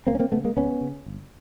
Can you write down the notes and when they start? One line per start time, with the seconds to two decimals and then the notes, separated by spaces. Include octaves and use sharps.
0.07 C#2 A#3 C4
0.15 C#4
0.19 A#3 C4
0.32 C#3 A3 B3
0.44 G#3 A#3
0.57 C#2 B3 C#4
0.81 C#3
1.06 G1